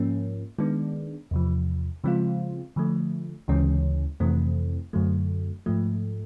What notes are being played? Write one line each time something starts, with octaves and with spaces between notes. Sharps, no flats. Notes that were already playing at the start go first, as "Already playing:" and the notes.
Already playing: G#2 F3 A#3 C#4
D#3 G#3 B3 D4
E2 C3 F3
C#3 F3 G#3 C4 F4
D3 F3 A3
D2 C#3 E3 G#3 C#4
F2 C3 E3 A3 C4
F#2 D3 F#3 A3
G#2 F3 A3